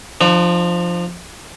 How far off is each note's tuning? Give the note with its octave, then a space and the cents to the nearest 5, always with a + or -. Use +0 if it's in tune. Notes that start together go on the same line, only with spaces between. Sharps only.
F3 +0 D4 +45